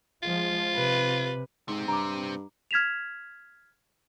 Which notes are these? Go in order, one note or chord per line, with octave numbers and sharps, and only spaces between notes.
F3 G#3 F4
C3 B4
G#2 C3 C4
G2 A#5 D6
F6 G#6 B6 E7 F7